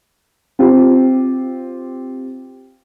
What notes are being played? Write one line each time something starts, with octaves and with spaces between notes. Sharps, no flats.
C4 F4 G4